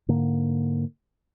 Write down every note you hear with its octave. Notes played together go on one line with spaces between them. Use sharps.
G#2 D3 A#3